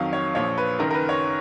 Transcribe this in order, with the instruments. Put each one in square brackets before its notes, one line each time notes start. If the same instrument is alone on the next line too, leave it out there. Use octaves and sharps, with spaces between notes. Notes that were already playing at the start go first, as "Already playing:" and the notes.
Already playing: [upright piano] F2 D#3 F#3 F5
C#5
A#1 A#2 F3 C#5
B4
F#1 F#2 D#3 A#4
A#4
B4
C#5